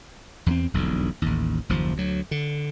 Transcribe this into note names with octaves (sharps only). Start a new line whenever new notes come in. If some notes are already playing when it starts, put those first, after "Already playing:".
E2 A3 C4
E1 B1 F2 D3
A1 D#2
F#1 D#2 F3
D2 F#3
D3